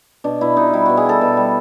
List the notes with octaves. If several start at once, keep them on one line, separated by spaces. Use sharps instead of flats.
B2 D4
B2 E4
B2 D#4
G3 E4
B2 F#4
G#4
G3 A4
B2
G3